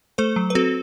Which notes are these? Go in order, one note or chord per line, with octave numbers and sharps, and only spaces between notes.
A3 A4 C5
F#3
B4
C4 F#4 A4